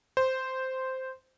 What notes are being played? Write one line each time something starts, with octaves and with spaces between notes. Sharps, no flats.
C5